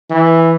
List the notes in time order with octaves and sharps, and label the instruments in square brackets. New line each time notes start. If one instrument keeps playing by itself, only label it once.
[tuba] E3